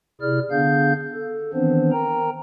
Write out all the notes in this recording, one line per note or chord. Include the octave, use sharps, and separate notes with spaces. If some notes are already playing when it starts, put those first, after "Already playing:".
C3 E4 G#4 D5 F6
D3 B3 D4 G#4 F5 G6
A4
D#3 E3 B3 C4 D4 C5
A#4 G5 A#5